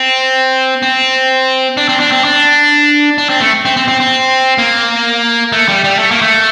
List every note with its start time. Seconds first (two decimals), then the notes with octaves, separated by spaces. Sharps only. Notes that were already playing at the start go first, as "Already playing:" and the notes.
Already playing: C4
0.83 C4
1.77 D4
1.89 C4
2.00 D4
2.12 C4
2.24 D4
3.18 D4
3.29 C4
3.41 A3
3.65 C4
3.77 C4
3.88 C4
4.00 C4
4.58 A#3
5.52 A3
5.69 G3
5.84 G3
5.99 A3
6.11 A#3
6.22 A3